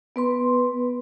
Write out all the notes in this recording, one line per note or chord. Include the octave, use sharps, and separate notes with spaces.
B3 B4 C6